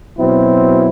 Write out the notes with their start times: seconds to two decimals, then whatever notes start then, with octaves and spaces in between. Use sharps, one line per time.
0.17 B2 F#3 C4 E4